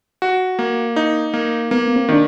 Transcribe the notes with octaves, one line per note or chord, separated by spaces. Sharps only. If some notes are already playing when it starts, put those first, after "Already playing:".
F#4
A#3
D#4
A#3
A#3 B3
B3
C4
D#3 D4